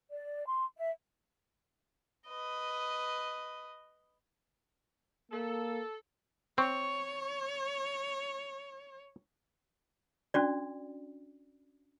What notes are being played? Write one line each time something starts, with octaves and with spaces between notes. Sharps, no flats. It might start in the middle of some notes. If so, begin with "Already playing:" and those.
D5
C6
E5
B4 D#5
A#3 A4
C4 C#5 C#6
C#4 D4 F#4 D5